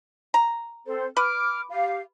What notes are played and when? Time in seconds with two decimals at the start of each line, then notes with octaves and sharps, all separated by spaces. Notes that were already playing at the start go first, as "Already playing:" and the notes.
0.34 A#5
0.87 C4 A4 C5
1.17 B4 D6 F6
1.71 G4 F5